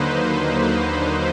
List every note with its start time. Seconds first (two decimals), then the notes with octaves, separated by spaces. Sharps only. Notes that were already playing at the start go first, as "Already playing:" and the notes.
Already playing: D#2 D3 F#3 A#3 D#4 B4 C5
0.63 B4